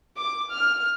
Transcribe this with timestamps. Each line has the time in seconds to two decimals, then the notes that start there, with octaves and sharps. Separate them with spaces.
0.17 D6
0.51 F6